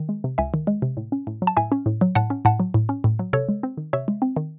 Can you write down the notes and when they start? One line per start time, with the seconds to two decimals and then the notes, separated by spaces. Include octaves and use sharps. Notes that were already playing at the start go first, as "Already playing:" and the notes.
Already playing: D#3
0.09 G#3
0.24 C3
0.38 C#2 E5 G#5
0.54 D#3
0.67 G#3
0.82 C3
0.97 A2
1.12 C#4
1.27 A2
1.42 F#3
1.47 A5
1.57 A2 E5 G#5
1.72 C#4
1.86 A2
2.01 F#3
2.15 A2 F#5 A5
2.30 C#4
2.45 A2 F#5 A5
2.60 F#3
2.74 A2
2.89 C#4
3.04 A2
3.19 F#3
3.33 C3 A4 C#5
3.49 G#3
3.63 C4
3.77 D#3
3.93 C3 C#5 E5
4.08 G#3
4.22 C4
4.37 D#3